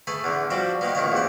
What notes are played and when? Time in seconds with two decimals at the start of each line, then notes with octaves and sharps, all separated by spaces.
0.07 A3 G#4 B4
0.24 E2 D3
0.50 F3 G3 D4 F#4
0.81 D#3 A#3 B3
0.95 A1 A#2 D#3 C#5
1.12 E2 C3 F#5